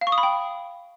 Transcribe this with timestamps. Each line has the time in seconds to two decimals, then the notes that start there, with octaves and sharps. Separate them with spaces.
0.01 F5
0.07 C#6
0.12 D#6
0.18 B5
0.23 G5